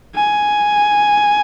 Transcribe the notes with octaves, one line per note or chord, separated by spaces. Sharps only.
G#5